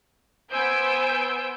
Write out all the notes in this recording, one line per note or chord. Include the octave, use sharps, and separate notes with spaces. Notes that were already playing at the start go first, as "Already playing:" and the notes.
B3 C5 G#5 E6 G6 D7